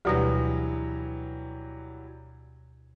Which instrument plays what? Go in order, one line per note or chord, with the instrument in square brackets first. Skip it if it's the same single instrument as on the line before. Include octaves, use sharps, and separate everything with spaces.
[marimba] D2 B2 A#6 [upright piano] E3 F#3 G3